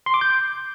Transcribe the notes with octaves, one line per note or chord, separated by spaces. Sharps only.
C6
D6
G6